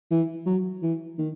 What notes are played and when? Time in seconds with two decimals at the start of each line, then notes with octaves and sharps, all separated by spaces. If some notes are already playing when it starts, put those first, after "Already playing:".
0.11 E3
0.46 F#3
0.82 E3
1.18 D#3